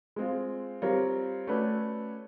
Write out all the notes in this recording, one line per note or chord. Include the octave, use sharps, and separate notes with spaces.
G#3 C4 F4
G3 C4 F4 A#4 C#5
A3 C#4 F#4 B4 D5